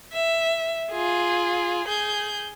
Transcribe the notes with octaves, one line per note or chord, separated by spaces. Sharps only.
E5
F4 G#4
G#4 G6